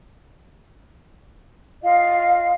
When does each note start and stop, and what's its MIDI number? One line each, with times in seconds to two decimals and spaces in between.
1.83 2.53 65
1.83 2.53 75
1.83 2.53 77